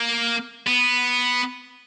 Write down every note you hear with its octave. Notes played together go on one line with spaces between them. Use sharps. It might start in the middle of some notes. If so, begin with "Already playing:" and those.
Already playing: A#3
B3